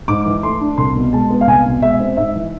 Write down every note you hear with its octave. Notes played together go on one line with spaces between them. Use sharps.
G#2 D6
E3
A3 C6
D4
C2 C6
B2
G#3 A5
B3
F5
C2 G#5
B2
G#3 E5
C4
G#2 E5
E3